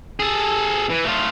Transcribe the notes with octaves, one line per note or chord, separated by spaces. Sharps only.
G#4 A4
E3
A3 F4